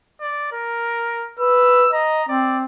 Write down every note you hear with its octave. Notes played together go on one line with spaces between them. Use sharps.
D5
A#4
B4 E6
D#5 A#5
C4 D5